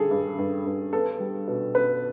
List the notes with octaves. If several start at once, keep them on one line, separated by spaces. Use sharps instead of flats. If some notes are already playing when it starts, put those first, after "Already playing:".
Already playing: G2 D3 G3 G#4 A4
G2
G2
G2
B3 A4
G3
B2
B3 B4